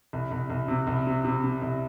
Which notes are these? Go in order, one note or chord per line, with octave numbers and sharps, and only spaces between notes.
C2
C2
C2
C3
C2
C3
C3
C3
C2